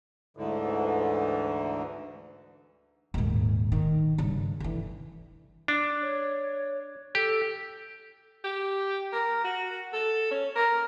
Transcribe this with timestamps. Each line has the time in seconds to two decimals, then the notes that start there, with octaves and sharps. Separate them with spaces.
0.37 D2 G#2 D3 E3
3.14 D#1 G#2
3.72 D#3
4.18 G2 C#3
4.60 D3 E3
5.68 D4
6.02 C#5
7.15 G4 A4
8.44 G4
9.13 A#4
9.44 F#4
9.93 A4
10.31 C#4
10.56 A#4